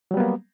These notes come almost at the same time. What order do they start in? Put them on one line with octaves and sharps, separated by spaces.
F#3 G3 B3 A#3